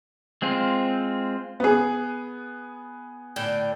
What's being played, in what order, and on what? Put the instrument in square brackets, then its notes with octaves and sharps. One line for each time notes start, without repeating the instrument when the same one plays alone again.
[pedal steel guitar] G#3 C4 F4
[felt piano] B3 G#4
[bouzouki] A2 D3 G5